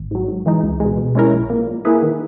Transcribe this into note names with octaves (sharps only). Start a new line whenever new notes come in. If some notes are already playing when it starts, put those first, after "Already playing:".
Already playing: G#1
G#2 F#3
G#2
E3 G#3 D#4
C#2
B2 G#3
B2
G#3 C#4 E4 A#4
A#1
A#2 A#3
A#2
A#3 E4 G#4 B4
D#3